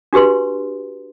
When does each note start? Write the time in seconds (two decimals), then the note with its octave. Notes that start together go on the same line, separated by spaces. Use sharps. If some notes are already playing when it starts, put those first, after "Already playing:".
0.13 D4 F#4 G4 B4 C6